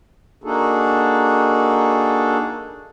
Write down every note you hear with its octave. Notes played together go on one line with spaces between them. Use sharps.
A#3 D4 D#4 F#4 G#4 A4